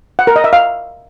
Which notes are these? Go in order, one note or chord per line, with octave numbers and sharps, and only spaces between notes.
F#5
A#4
D#5
E5
F5